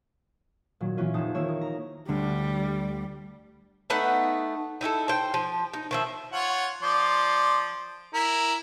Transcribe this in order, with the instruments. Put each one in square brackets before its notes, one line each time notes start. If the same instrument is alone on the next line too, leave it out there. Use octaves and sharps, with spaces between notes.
[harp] A#2 D#3 F#3
A#2 E3 C#4 F4
F1 D#4 C5 A5
D#3 A#3 E4 C#5 E7
D#4
A#5
[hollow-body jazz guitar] D2 D3 [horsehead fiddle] G3
[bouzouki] A3 B3 D#4 F#5
D#4 E4 F#4 A4
C5 G5
F3
D#4
D#3 F3 E5
[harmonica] F4 C#5 F#5
F3 D5 C6
E4 A#4